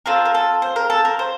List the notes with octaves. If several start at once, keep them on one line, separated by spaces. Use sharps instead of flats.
C4 F4 A4 A#4
A#4
A4
C5
A#4
A4
A#4
C5